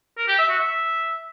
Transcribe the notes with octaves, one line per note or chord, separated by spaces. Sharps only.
A#4
G4
E5
F#4
E5